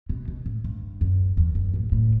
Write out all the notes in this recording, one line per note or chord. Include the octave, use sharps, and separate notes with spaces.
B2
B2
A2
G2
F#2
E2
F#2
A2
A2